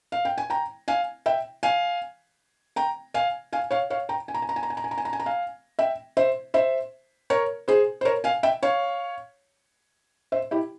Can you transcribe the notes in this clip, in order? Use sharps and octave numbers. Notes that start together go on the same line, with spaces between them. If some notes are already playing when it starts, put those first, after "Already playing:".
F5
G5
G#5
G5 A#5
F5 G#5
E5 G5
F5 G#5
G5 A#5
F5 G#5
F5 G#5
C#5 F5
C#5 F5
G5 A#5
G#5
A#5
G#5
A#5
G#5
A#5
G#5
A#5
G#5
A#5
G#5
A#5
G#5
A#5
F5 G#5
E5 G5
C5 E5
C5 E5
A#4 C#5
G#4 C5
C5
A#4 C#5
F5 G#5
E5 G5
C#5 F5
C5 E5
E4 G4